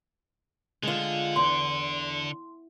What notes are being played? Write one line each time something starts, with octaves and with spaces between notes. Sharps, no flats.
D3 G#3 F4
E2 C6